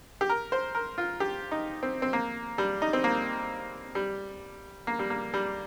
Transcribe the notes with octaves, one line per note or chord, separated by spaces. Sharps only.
G4
A#4
C5
A#4
F4
G4
D#4
C4
C4
A#3
G3
D#4
C4
A#3
G3
A#3
G3
A#3
G3